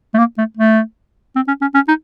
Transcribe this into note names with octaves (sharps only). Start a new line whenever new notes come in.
A3
A#3
A3
A3
C4
C#4
C#4
C#4
D#4